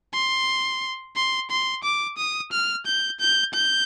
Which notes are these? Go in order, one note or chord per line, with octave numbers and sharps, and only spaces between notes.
C6
C6
C6
D6
D#6
F6
G6
G6
G6